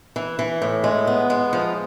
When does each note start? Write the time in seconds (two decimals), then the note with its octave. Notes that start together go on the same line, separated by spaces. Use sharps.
0.16 E3
0.39 E3
0.62 A2
0.84 G#3
1.07 B3
1.30 G#3
1.53 F3